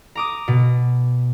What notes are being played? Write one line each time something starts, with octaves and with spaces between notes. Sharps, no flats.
A#5 D6 D#6
B2